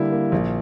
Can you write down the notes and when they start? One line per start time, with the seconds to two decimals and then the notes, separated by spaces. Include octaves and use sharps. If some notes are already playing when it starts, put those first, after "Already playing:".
Already playing: D3 G3 A#3 E4
0.12 A#3
0.32 A#1